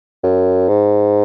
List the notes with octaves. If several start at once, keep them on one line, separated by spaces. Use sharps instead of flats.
F#2
G#2